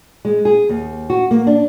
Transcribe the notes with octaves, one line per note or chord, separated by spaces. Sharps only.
G#3
G#4
D#2
F#4
A#3
D4